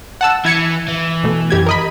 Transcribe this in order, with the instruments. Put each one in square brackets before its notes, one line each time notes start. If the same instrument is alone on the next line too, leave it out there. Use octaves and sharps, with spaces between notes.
[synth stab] F#5 A5 E6
[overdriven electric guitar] E3 [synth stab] E4 G#6 C#7
[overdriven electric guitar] E3
[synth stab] B2 A3
F#2 G4 G#6
A#4 D#5 B5